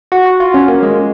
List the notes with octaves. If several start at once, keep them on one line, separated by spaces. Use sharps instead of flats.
F#4
F#4
F4
C#4
A#3
G#3